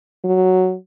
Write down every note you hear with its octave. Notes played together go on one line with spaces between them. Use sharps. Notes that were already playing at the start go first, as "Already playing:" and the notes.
F#3